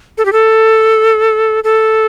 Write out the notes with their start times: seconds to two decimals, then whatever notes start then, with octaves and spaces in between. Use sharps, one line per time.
0.18 A4
0.25 G4
0.33 A4
1.64 A4